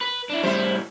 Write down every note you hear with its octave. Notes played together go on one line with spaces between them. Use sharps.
B4
D4 E4
A2 G3 E4 C5